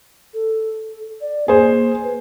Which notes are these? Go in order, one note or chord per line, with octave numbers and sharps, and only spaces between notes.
A4
D5
A#3 G#4 C5
B4